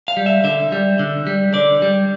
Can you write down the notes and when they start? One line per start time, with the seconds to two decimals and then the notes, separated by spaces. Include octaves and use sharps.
0.08 F5
0.17 G3
0.26 E5
0.44 D3 E5
0.72 G3
0.99 D3
1.27 G3
1.54 D3 D5
1.82 G3